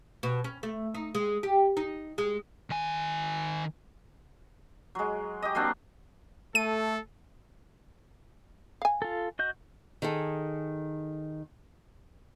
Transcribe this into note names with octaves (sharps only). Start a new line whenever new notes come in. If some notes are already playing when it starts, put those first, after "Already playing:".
B2
C#4
A3
D#4
G#3
G4
D#4
G#3
D#3 G#5
F#3 G#3
G4 D#5
F#3 A#3 C4 D4
A3 A4 D#7
F5 G#5
F4 A4
F#4 D#5 G6
D#3 G#4 A4